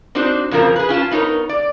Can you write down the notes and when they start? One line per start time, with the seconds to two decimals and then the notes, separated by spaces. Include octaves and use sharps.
0.15 C4 D4 D#4 F#4 C5
0.51 F2 C#3 F3 A#3 A#4
0.76 G#4 B4
0.89 C#4 F4 G5 A5
1.11 B3 D#4 A#4 C#5
1.49 D5